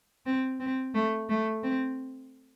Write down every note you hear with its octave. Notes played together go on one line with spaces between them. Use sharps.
C4
C4
A3
A3
C4